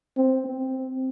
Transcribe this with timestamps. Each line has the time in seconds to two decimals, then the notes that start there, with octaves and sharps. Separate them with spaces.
0.17 C4
0.46 C4